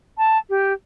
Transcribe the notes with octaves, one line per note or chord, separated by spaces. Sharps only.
A5
G4